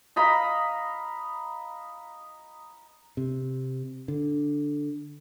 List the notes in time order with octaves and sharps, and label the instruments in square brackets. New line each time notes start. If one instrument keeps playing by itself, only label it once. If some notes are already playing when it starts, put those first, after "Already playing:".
[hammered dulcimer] D#5 F5 A#5 B5
[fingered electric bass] C3
D3